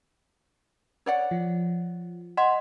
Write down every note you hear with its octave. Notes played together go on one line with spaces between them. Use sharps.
C#5 D5 F#5
F3
D#5 F#5 C6